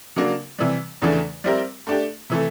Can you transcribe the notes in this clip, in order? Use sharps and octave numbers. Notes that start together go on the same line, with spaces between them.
C#3 F#3 A#3 D4
C3 E3 G3
E2 C#3 E3 A3 D4
G3 C4 E4 G4 A#4
A3 D4 G4
C3 E3 A3